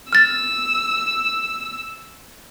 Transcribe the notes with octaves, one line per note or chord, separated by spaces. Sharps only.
E6 F6 A6